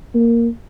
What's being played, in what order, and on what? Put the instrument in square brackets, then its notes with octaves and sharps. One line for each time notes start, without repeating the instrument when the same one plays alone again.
[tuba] A#3